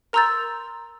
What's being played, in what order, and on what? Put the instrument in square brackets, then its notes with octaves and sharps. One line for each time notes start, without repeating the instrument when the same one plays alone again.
[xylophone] A#4 A#5 C6 E6 G6 A6